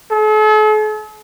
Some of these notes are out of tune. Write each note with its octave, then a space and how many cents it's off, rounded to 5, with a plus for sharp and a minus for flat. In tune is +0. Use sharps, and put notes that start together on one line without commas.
A4 -45